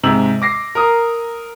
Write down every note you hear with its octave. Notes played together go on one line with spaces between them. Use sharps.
G#2 C3 E6 F#7
D6 A#6 C7
A#4 A#5 D#6